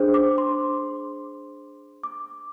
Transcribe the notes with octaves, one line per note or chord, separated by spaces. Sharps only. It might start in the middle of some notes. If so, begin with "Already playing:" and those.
Already playing: D4 G#4 C5
D6
C6
D6